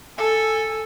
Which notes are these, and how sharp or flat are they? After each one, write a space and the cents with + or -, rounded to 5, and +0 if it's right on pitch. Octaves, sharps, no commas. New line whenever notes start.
A4 +0 G#5 +0